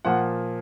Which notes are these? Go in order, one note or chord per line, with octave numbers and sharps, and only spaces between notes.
A#2 F3 A#3 F#5